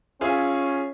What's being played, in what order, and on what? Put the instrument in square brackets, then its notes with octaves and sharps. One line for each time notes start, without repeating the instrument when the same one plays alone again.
[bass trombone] C#4 [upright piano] F4 G#4 E5